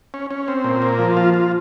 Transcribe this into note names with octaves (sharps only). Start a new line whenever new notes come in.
C#4
C#4
C4
A#2
A#3
F3
F4
F4